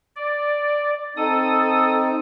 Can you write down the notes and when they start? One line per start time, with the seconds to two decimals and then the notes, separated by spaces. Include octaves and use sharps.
0.16 D5
1.17 C4 D#4 A4 D#6